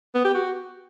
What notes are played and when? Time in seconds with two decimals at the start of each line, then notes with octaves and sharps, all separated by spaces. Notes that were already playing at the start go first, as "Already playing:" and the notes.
0.15 B3
0.24 G4
0.34 F#4